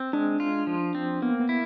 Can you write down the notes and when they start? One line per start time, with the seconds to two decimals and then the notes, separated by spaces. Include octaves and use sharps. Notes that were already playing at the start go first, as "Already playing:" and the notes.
Already playing: C4
0.13 G#3 D4
0.40 F4
0.67 F3
0.95 C4
1.22 A#3 B3
1.40 B3
1.49 E4